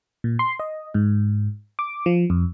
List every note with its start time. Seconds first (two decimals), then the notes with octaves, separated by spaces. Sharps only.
0.24 A#2
0.39 C6
0.60 D#5
0.94 G#2
1.79 D6
2.06 F3
2.30 F2